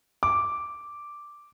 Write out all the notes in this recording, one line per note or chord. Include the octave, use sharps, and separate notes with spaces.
D6